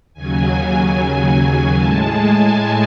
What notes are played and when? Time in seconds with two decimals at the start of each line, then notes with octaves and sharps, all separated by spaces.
0.14 D#2 C#3 F#3 G#5
0.54 G#5
1.75 A2 G#3 A5
2.16 G#5
2.55 G#5